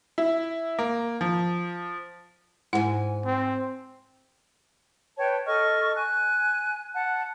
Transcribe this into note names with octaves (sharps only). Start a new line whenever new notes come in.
E4
A#3
F3
G#2 E4 A4 F#5 G#5
C4
B4 C#5 G5 A5
A4 D#5 C#6 F6
G#5 F#6
F#5 A5 F#6